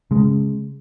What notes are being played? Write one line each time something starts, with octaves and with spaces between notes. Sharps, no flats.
C#3 G#3